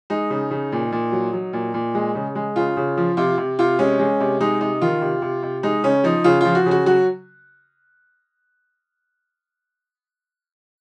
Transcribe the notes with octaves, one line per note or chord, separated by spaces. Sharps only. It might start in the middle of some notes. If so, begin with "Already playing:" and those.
G#3 D#4
C#3
C#3
A#2
A#2
F#3
F#3
A#2
A#2
G#3
C#3
G#3
C#3 F4
C#3
F3
C3 F4
C3
C3 F4
G#3 C#4
G#3
C3
G#3 D#4
C3 D#4
D#3 F4
C3
C3
C3
G#3 D#4
C#3 C#4
F3 D#4
C#3 F4
F3 F4
F#4
C#3
F#4
F#3 F#4